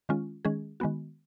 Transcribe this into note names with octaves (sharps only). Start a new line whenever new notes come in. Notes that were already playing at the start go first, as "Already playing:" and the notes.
D#3 G#3 C#4 F4
D#3 G#3 C#4 G#4
D#3 G#3 B3 F#4